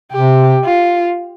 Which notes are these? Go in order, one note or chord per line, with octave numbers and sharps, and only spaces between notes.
C3 G4
F4